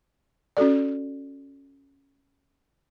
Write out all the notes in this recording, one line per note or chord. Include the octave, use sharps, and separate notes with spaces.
C#4 F#4 A4 D5